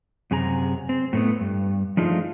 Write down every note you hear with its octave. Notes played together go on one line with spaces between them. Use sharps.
F#2 C3 G#4 A#5
C4
A2 A3 B3
G2
F3 A3 D4 D#4 F4 G#4